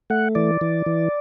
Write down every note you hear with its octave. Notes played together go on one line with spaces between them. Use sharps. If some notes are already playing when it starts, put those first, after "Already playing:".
A3 F#5
E3 D5
E3
E3